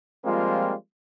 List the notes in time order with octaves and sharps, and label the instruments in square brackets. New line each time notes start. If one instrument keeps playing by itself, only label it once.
[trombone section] F3 G3 G#3 A#3 C4 F4